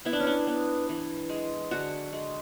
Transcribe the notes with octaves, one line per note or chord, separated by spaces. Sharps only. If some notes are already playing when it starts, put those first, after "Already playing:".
B3 E4
D4
C#4
D4
B3
E3
G#3
D3 F#4
G#3